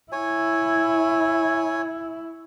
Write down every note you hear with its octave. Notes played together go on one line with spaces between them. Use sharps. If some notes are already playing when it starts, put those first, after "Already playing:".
E4 C#5 G#5